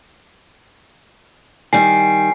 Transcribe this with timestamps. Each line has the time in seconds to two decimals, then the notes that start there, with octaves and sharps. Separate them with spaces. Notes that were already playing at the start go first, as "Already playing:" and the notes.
1.73 D#3 G3 G#5 C7